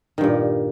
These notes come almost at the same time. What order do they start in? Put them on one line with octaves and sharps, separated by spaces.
D#3 G2 A#2